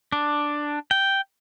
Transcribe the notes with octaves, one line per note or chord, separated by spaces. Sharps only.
D4
G5